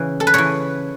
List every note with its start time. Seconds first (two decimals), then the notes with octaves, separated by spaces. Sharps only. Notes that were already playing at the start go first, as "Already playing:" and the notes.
Already playing: C#3 E3
0.20 A4
0.27 B4
0.34 C#3 E3 C#5